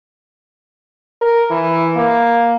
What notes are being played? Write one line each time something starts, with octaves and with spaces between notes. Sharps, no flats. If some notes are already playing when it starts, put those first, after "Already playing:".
A#4
E3
A#3